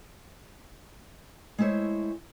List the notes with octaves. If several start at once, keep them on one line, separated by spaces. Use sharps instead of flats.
G#3 A3 E4 C5 C#5